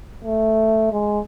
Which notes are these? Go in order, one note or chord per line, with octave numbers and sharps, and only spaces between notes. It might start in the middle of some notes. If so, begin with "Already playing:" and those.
A3
G#3